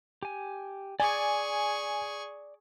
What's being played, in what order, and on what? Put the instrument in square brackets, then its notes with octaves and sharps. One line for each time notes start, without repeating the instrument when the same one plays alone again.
[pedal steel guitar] G4 G#5
[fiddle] G#4 C#6 [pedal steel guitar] D5 D6 [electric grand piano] G#5